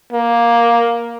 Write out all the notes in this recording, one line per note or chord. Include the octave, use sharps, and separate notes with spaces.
A#3